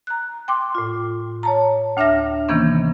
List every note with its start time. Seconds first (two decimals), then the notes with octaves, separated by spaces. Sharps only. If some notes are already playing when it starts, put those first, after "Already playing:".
0.07 A#5 F#6
0.48 G5 C6 D6
0.75 A2 F4
1.43 C#5 A5 A#5
1.97 D2 D4 E5 F6 A#6
2.48 C3 D#3 E3 A#3 B3 C#4